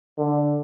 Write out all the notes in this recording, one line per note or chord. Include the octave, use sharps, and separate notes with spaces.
D3